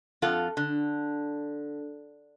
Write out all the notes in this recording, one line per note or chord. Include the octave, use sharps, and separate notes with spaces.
F2 F4 A4 F#5
D3